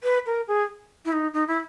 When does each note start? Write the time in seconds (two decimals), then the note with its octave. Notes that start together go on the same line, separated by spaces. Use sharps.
0.03 B4
0.26 A#4
0.48 G#4
1.05 E4
1.12 D#4
1.33 D#4
1.48 E4